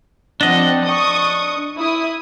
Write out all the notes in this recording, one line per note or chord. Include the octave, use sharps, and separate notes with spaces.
F3 C4 D4 D#5 F#5
C#6 D#6
E4 D#6